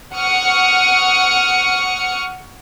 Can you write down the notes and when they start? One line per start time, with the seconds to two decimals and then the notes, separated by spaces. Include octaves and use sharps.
0.16 F#5 C#6 D#6 F6 C#7